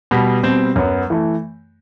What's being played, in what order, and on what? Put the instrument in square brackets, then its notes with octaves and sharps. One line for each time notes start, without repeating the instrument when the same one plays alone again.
[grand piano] B2 G3 B3
B2 G3 C4
F#2 F#3 B3
E3 A3